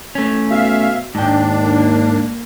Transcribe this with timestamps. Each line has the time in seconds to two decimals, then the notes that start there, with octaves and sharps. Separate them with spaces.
0.15 A3 C#4
0.51 B2 E5 F5
1.15 D#2 G#2 D4 G5
1.63 A#3